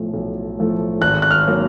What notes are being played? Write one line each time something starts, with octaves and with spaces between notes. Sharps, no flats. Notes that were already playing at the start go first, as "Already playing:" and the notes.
Already playing: B1 A2 F3 A3
B1
A2 F3 A3
G#1 F#6
F#6
F6
D#3 F#3 A#3